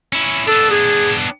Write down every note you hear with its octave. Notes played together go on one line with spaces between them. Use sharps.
C#4 E4
B3 D4 A4
G#4